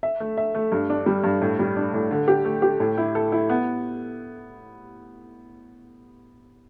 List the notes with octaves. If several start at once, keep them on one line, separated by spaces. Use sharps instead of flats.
E5
A3
E5
A3
G2
D4
G3
G2
A2
G3
D4
A2
D3
G4
A3
G4
A2
E4
A4
E4
B3